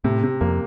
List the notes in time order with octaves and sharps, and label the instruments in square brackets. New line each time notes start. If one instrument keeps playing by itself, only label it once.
[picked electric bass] A2 [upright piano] C3
[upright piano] C3
[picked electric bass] F2 [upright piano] A#3